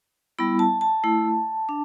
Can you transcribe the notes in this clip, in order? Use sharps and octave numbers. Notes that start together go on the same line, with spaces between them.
G3 B3 E4 B5
A5
A5
A3 E4
D4